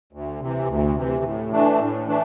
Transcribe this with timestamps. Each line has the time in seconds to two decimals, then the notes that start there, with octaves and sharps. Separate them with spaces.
0.13 D2
0.41 C3 E3
0.68 D2
0.96 C3 E3
1.24 A2
1.52 E3 A3 D4
1.79 A2
2.07 E3 A3 D4